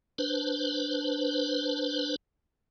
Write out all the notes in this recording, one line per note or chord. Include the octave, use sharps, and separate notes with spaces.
D4 B4 C5